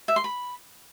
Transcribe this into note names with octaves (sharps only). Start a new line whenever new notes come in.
E5
C6
B5